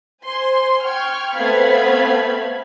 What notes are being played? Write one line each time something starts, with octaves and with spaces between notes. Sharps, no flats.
C5 G#5 C6
G5 C#6 F6 G#6
A3 B3 C4 F5 B5 G#6